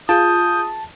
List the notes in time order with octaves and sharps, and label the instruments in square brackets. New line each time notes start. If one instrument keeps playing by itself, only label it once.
[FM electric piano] F4 G#4 [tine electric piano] A5 [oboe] D#6 [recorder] G6